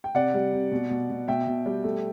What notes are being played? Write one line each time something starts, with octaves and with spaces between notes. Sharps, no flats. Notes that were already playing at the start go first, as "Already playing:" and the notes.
G5
C3 D5 F#5
G3
C3
B2
B2
B2
B2 E5 G5
B2
G3
A3